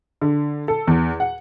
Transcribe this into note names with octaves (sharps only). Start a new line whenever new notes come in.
D3
A4
E2
F#5